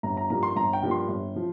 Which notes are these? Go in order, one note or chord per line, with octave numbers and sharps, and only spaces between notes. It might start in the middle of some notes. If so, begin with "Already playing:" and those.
G1 A#5
A#5
G2 F3 A#3 A#5
C6
G1 A#5
G5
G2 F3 A#3
C6
G1
F3